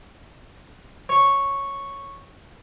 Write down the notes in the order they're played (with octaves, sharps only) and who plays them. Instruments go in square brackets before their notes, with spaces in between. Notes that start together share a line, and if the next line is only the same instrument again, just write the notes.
[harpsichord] C#5 C#6